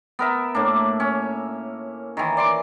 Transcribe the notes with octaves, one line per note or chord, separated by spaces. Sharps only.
B3 A#4 E5
A2 A#3 D4
C#4
D#3 E3
D5 C6 D6